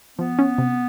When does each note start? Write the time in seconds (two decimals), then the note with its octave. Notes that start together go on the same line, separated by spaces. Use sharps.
0.19 F3 B3
0.39 C#4
0.58 C3